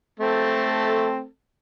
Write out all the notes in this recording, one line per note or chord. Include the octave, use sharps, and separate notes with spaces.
A3 C4 A4